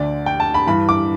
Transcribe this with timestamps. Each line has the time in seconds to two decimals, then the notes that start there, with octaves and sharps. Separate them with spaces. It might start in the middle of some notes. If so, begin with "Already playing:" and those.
Already playing: D2 D3 D5
0.26 G5
0.40 A5
0.54 B5
0.67 G2 E3 B5
0.89 D6